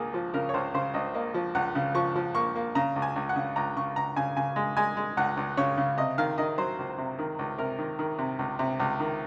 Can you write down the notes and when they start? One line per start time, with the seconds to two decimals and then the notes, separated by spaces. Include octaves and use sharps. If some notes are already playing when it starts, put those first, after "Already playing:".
Already playing: C#2 A#3 G#4
0.14 F3
0.34 C#3 A#4
0.49 C#5
0.54 C#2 C5
0.74 C#3 C5
0.94 C#2 D#5
1.14 A#3 D#5
1.34 F3
1.55 C#2 F#5
1.75 C#3
1.95 F3 C#6
2.15 F3
2.35 A#3 C#6
2.56 A#3
2.75 C#3 A#5
2.96 C#2
3.02 G#5
3.16 C#2
3.29 F#5
3.36 C#3
3.56 C#2 A#5
3.76 C#3 C#6
3.96 C#2 A#5
4.16 C#3 G#5
4.37 C#3 G#5
4.56 G#3
4.77 G#3 G#5
4.97 G#3
5.17 C#2 F#5
5.37 C#2
5.57 C#3 C#5
5.77 C#3
5.97 C3 D#5
6.18 D#3 F5
6.38 D#3 D#5
6.58 F#3 C5
6.79 C#2
6.98 C3
7.19 D#3
7.39 C#2
7.58 C3 A#4
7.78 D#3
7.99 D#3
8.19 C3
8.39 C#2
8.59 C3
8.80 C#2
9.00 D#3